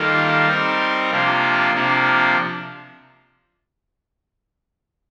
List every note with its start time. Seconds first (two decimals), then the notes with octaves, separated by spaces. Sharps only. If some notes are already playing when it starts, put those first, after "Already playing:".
Already playing: D#3 G3 A#3 F4 A4
0.48 G3 C4 D#4 G4 A#4
1.11 C3 F3 A#3 D4 F4
1.74 C3 F3 A#3 D4